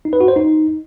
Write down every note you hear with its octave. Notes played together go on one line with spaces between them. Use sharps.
D#4
B4
F#4
C5
D#4